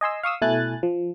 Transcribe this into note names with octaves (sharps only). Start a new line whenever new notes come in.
D#5 G#5 C6 E6
F5 C#6 D#6 E6
B2 A3 E4 G#5 F#6 A6
F3